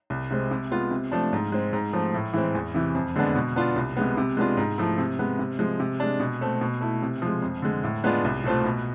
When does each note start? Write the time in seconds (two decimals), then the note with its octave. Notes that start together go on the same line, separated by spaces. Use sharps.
0.10 C2
0.31 C3 G#3 C4
0.51 C3
0.71 G#3 B3 F4
0.91 C3
1.12 F3 A3 D4
1.33 G#2
1.52 G#3 C4
1.73 G#2
1.93 F3 A3 C4
2.14 A2
2.33 E3 G#3 C4
2.55 E2
2.74 C3 E3
2.95 F2
3.16 D3 G#3 B3 D4
3.35 B2
3.56 B3 D4 F4
3.76 C2
3.97 C3 G#3 B3
4.17 C3
4.37 G#3 B3 D4 F4
4.57 G#2
4.78 F3 A3 E4
4.98 C3
5.19 G#3 B3
5.39 C3
5.59 F3 G#3
5.80 C3
6.00 G#3 D4
6.20 B2
6.41 A3 C4
6.61 B2
6.81 A3 E4
7.02 C3
7.22 F3 G#3
7.42 F2
7.62 D3 G#3
7.84 A2
8.04 G#3 B3 D4 F4
8.24 C2
8.44 B2 A3 C4 F4
8.65 B2